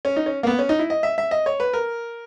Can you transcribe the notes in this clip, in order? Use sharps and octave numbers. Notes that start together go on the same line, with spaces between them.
C#4
D#4
C#4
A#3
B3
C#4
D#4
E4
D#5
E5
E5
D#5
C#5
B4
A#4